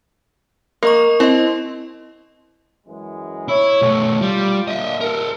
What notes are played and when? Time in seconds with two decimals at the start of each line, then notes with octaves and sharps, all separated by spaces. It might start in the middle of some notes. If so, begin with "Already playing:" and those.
0.83 A#3 A#4 D#5 C#6
1.20 C4 E4 D#5
2.86 F#2 E3 G#3
3.48 E4 C#5
3.82 B1 A3
4.21 G3 F4
4.68 A#2 D3 D#5 E5
5.01 A4 A#4